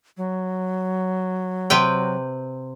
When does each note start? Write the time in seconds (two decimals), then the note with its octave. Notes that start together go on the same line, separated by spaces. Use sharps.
0.17 F#3
1.70 C3 B4 G5